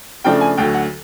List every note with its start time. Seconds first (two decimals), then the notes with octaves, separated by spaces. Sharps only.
0.24 C#3 F3 A3 D4 G5
0.41 G#5
0.57 D2 D3 F#3 G5
0.74 F#5